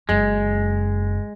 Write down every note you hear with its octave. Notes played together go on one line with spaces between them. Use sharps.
F#1 F#2 G#3